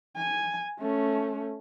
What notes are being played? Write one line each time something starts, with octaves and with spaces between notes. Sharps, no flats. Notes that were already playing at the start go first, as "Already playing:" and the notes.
G#5
A3 C#4